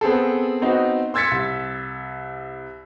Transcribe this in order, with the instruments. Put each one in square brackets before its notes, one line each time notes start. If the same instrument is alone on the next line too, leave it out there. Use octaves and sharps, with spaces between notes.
[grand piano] B3 C4 G#4 A4
B3 C4 D#4 F#4
C6 E6 G#6 A6 B6 C#7
C2